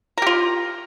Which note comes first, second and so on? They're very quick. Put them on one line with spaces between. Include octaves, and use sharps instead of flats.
A#4 G4 F4